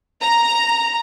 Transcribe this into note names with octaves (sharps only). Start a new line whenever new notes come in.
A#5